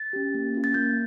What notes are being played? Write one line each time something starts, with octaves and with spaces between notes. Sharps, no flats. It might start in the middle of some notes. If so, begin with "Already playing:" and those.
Already playing: A6
C#4 G4
A#3
C#4 F4
A6
A#3 G6